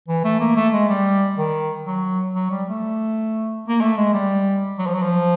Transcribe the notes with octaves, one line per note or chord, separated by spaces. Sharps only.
E3
A3
A#3
A3
G#3
G3
D#3
F#3
F#3
G3
A3
A#3
A3
G#3
G3
F#3
F3
F#3
F3